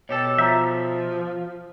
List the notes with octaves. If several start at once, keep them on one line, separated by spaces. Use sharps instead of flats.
B2 G4 A4 C#5
F3 E5 A#5 G6